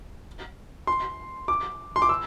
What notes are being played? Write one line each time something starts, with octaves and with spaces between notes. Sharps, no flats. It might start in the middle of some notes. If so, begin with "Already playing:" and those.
C6
D6
C6
D6
E6